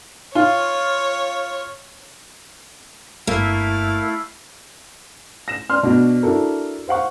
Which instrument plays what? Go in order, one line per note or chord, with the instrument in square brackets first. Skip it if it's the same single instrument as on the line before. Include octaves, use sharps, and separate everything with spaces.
[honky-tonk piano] F4 [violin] C#5
[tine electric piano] G1 G2 [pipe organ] A3 E4 [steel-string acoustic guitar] A#3 [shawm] F5
[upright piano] A#6 E7
D5 C6 F6
B2 D4 F#4
D4 E4 F#4 A4 A#4
C5 F5 F#5 C#6